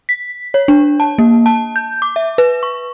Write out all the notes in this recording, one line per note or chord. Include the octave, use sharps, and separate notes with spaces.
B6
C#5
D4
A5
A#3
A5
G6
D6
E5
B4
C#6